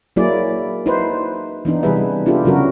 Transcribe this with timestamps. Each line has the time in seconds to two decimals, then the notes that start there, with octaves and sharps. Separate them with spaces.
0.16 F#3 A#3 E4 G#4 D5
0.86 D#4 E4 B4 C5
1.65 E3 B3 D4 D#4
1.83 C3 E3 G3 G#4 B4 E5
2.26 B3 D4 E4 F4 G4 A4
2.45 C#3 F#3 F#4 A#4